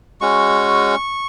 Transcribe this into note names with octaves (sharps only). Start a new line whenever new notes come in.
G#3 C#4 F#4 C#6